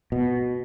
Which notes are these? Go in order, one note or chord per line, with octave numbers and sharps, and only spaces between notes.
B2